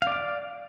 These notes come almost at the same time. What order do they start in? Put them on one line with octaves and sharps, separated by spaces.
F5 D5 D6